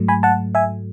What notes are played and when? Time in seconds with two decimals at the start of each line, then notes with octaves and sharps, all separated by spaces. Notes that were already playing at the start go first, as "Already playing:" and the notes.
Already playing: G#2 F#3 A3
0.08 G#5 B5
0.23 F#5 A5
0.55 E5 G#5